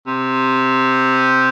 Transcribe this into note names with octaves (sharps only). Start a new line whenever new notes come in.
C3